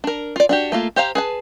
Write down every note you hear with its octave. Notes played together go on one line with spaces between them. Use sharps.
D4 A#4
F4 D5
D4 F#4 G4
A3 A#3 F4
G4 C5 F5 A#5
G#4 B4 A5